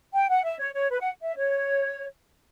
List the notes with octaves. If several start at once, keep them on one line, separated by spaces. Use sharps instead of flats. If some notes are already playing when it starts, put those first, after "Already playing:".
G5
F#5
E5
C#5
C#5
B4
F#5
E5
C#5